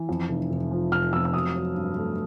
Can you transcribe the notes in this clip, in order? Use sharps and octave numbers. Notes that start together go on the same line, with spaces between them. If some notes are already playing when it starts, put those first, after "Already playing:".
Already playing: E3
F2
F1
F1
F3
F1 F6
F2 E6
E6
F#3 D#6
F#3
G2
A3